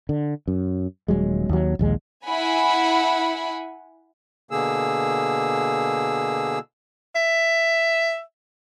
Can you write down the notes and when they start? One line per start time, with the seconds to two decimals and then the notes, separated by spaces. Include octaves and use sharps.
0.09 D3
0.48 F#2
1.08 D#1 F#3 G#3
1.49 D#2 F#3
1.79 A#1 D#2 G#3
2.25 E4 F#5 G#5 B5
4.51 B2 D3 A#3 G#4 E6
7.15 E5